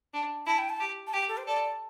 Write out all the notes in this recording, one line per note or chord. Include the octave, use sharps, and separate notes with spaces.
D4
E4 A5
G5
A5
G4
A5
G4 G5
A4
C5
A4 D5